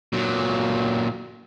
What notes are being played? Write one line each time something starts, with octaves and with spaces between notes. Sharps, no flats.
A#2 F#3